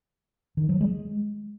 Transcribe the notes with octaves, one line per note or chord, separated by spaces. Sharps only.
D#3
F#3
G#3